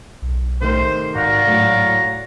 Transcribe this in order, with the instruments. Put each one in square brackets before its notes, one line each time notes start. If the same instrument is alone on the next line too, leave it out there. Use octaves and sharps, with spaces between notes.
[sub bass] B1
[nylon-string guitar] C3 D#3 A3 [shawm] C5
[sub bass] G#2 [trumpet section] F#4 D5 F5 [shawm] A#5
[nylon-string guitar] A2 F#3